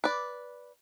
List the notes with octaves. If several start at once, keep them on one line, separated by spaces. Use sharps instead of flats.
B4 D5